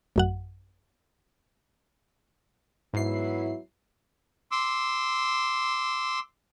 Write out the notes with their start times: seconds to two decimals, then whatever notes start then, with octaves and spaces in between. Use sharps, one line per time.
0.16 A1 F#2 F#5
2.94 G#2 F#3 B3 E4 C7
4.51 C6 D6 E6